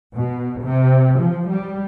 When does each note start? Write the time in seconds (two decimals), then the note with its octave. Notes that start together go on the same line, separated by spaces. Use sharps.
0.15 B2
0.63 C3
1.20 F3
1.49 G3